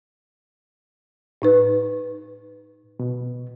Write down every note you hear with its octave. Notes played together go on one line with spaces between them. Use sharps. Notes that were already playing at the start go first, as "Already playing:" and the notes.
A2 D#4 B4
B2